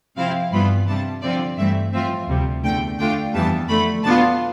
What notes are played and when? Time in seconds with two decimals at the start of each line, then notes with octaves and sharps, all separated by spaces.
0.17 C3 F3 C4 E4 F5
0.52 G2 E3 B3 F4 B5
0.87 C3 G3 D4 A5
1.22 D3 F3 C4 F4 D5
1.58 G2 E3 A3 C4 E5
1.93 A2 F3 C4 F4 E5
2.28 D2 C3 G3 C4
2.63 E2 D3 A3 G5
2.99 D3 A3 D4 F4 G5
3.34 F2 E3 G3 B3 A5
3.69 F2 D3 A3 B5
4.04 B2 B3 D4 F4 A5